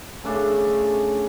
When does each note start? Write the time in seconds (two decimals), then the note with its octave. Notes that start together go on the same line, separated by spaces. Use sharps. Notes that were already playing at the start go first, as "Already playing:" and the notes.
0.24 C#3 A3 D4